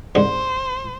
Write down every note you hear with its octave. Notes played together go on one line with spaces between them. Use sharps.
C2 G#2 D3 C5